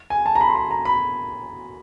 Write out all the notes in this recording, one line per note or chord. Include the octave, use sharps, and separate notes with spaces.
G#5
A5
A#5
B5
C6
B5
A#5
B5